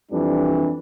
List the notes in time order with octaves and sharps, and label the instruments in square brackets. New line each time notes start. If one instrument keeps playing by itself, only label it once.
[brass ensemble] F2 E3 G3 D4